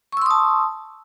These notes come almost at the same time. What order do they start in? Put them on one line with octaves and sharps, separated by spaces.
C#6 E6 C6 D#6 A5